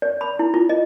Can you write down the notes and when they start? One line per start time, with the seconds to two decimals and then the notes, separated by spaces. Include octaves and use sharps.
0.02 D5
0.21 B5
0.39 E4
0.54 F4
0.69 D#5